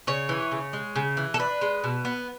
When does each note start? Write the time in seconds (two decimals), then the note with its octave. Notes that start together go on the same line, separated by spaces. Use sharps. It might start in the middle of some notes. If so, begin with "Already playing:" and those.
0.07 C#3 C#5
0.29 E3
0.52 C#3
0.73 G#3
0.96 C#3
1.17 E3
1.34 A4
1.39 D4 B4
1.61 G#3
1.84 B2
2.05 B3